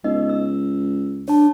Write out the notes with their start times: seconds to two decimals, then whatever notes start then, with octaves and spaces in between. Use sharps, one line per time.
0.04 C#2 B3 D#4 D#5
0.29 E6
1.28 D4 C#5 A5